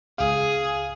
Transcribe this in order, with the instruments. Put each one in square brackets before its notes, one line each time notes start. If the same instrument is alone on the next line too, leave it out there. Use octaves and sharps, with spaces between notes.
[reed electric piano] C#2 F5 [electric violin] G#4